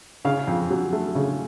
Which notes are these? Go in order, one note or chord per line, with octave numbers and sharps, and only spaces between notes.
C#3 F5
F2
F#3
A3
C#3